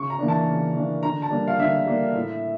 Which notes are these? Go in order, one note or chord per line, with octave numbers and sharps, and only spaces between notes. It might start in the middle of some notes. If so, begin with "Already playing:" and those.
Already playing: C#3 C#6
A#5
E3 A#3 D4
A5
C#3
E3 A#3 D4
D3 A#5
A5
G3 A#3 D4
F5
D3 E5
G3 A#3 D4
A2